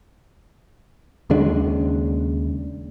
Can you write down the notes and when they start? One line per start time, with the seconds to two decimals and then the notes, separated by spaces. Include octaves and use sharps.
1.30 D#2 C#3 G#3 D4